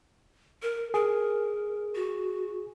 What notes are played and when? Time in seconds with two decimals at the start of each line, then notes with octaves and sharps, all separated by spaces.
0.62 A#4
0.94 G#4 A#4
1.95 F#4